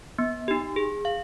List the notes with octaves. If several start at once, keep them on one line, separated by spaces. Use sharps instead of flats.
B3
D#4 G4
G#4
F5